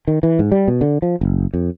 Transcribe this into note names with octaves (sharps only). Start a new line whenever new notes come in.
D#3
E3
G#2
G3
B2
D3
F3
F#1
F2